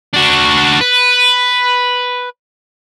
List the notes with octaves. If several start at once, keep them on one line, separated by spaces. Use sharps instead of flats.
D4 F#4
B4